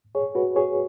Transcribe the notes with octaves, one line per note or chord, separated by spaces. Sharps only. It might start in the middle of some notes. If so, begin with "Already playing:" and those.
G#4 C#5
F#4 B4
G#4 C#5